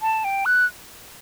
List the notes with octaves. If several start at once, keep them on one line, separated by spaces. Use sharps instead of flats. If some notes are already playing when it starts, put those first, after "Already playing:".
A5
G5
F#6